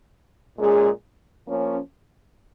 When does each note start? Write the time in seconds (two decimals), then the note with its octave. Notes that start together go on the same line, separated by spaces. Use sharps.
0.58 A#2 G#3 C#4 G#4
1.47 F3 A#3 C#4